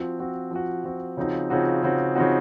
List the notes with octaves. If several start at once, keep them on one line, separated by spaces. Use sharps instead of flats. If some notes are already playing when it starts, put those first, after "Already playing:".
Already playing: F3 C4 F#4
F3 C4 F#4
F3 C4 F#4
F3 C4 F#4
C#3 F3 C4 D#4 F#4
C#3 F3 C4 D#4 F#4
C#3 F3 C4 D#4 F#4
C#3 F3 C4 D#4 F#4